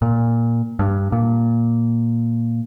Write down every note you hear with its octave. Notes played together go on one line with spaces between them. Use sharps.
A#2
G2
A#2